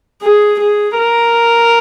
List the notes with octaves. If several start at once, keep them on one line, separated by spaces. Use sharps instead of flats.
G#4
G#4
A#4